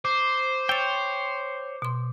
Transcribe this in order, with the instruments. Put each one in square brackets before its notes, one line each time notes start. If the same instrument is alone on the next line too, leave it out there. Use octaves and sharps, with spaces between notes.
[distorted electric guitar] C5 [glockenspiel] D6
[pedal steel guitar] C#5 G5 [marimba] E6 A6
[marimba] B2 C6